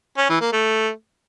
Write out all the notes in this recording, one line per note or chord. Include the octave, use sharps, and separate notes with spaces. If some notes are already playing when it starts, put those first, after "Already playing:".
C#4
E3
A#3
A3